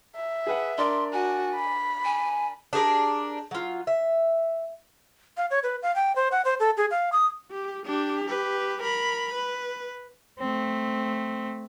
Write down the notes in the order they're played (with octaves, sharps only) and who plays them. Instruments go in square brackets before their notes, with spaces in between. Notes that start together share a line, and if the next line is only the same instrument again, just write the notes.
[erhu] E5
[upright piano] G#4 B4 F#5
[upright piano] D4 A#4 D5 [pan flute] C6
[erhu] F#4 [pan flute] G#5
[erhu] B5
[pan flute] G#5
[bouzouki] D4 G4 G#4 A#4
F#3 F4
E5
[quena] F5
C#5
B4
F5
G5
C5
F#5
C5
A4
G#4
F5
D#6
[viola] G4
D4 G4
G4 B4
A#4 B5
B4
[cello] A3 C4